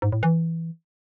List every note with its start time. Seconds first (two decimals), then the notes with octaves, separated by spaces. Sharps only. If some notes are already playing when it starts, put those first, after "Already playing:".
0.02 G#2
0.12 A2
0.23 E3